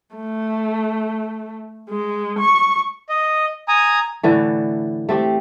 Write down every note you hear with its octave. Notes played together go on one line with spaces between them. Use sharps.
A3
G#3
C#6
D#5
G#5 A#5 D#6
A2 D3 E3 A3
A3 C4 G4